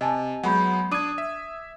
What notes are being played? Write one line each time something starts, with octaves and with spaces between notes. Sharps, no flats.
C3 D#5 G#5 A5
F#3 G#3 B3 F#5 B5 G6
D4 D6 D#6 G#6 D#7
E5